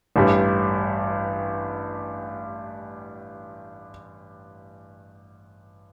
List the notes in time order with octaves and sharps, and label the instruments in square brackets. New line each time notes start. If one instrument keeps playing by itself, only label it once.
[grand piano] A1 G2 G3